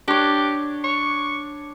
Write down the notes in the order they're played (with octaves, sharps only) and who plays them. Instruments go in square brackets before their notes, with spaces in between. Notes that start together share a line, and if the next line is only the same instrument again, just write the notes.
[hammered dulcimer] D4 C#5 [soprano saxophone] G4
[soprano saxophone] C#6